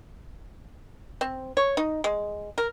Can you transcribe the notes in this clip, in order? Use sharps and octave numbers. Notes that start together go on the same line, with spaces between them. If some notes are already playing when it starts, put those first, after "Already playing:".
C4
C#5
D#4
G#3
A#4